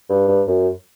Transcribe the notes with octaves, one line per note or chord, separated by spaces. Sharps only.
G2
G2
F#2